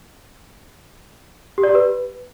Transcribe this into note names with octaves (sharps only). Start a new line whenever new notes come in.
G4
D5
G4
B4